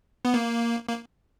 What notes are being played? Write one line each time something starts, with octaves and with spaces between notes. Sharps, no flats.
B3
A#3
A#3